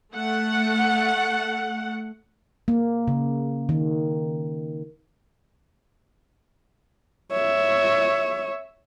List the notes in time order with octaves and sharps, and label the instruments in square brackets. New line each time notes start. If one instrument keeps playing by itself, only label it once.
[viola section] A3 F#5
[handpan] A#3
C#3
D#3
[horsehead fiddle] C#5 E5